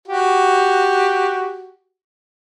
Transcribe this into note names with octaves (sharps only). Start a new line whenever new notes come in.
F#4 G4